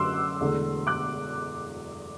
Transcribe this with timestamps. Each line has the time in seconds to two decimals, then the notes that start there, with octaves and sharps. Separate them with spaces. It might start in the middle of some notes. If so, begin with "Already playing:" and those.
Already playing: F#2 D3 F#3 A3 C6 D6 E6 F#6
0.40 E1 E2 D3 A3
0.87 D6 F#6